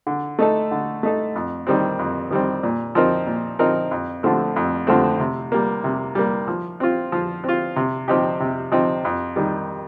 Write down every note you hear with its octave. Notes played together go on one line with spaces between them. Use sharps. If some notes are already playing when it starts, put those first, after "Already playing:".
D3
A3 D#4 A4
D3
A3 D#4 A4
F2
D#3 G3 C4
F2
D#3 G3 C4
A#2
F3 C4 D#4 A#4
A#2
F3 C4 D#4 A#4
F2
D3 F3 A3 C4
F2
D3 F3 A3 C4
C3
G3 A#3
C3
G3 A#3
F3
C4 F4
F3
C4 F4
C3
F3 C4 D#4 G4
C3
F3 C4 D#4 G4
F2
D#3 G3